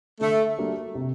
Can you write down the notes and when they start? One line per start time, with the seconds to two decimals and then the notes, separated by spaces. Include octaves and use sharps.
0.21 D3 A3
0.58 G3 A#3 D4 F#4
0.95 C3